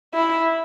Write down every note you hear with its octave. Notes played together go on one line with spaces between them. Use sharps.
E4